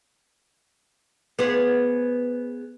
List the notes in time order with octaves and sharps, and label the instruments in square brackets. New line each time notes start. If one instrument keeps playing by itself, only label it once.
[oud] B3 G#4 C5